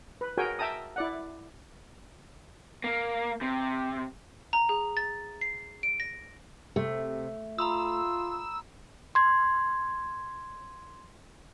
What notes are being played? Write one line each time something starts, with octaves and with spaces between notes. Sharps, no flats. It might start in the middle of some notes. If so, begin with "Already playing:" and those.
B4
F#4 G#4 A#4 C#5 G5 G#5
E5 G5 A5 A#5 D#6
E4 D5 F#5
A#3
C3
A#5
G#4
A6
C7
D7
A#6
C3 A3
F4 A#5 B5 D#6 E6
C6 G#6